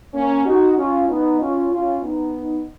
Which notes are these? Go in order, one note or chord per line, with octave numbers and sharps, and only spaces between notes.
A#3 C#4
D#4 F#4
C#4 F4
B3 D#4
C#4 F4
C#4 F4
B3 D#4